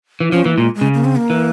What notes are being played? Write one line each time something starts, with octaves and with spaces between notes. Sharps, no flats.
E3
F3 C#4
E3 A#3
A#2 G#3
G#3
C#3
A#3
C4
A#3
E3